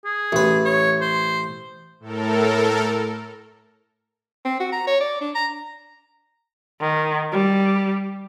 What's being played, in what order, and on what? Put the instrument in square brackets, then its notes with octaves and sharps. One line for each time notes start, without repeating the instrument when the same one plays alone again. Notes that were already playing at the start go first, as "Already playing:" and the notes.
[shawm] G#4
[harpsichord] A1 B4
[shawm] C#5
C5
[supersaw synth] A2 A4 A#4
[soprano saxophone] C4
F#4
A#5
C#5
D5
D4
A#5
[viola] D#3
G3